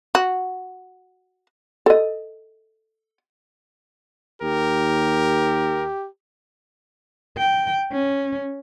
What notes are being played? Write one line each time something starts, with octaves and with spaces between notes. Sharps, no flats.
F#4
A4 D#5
D#2 G4 A#4
G5
C#4